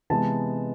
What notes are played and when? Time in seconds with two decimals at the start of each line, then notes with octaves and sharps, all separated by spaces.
0.10 C3 E3 G#3 B3 A5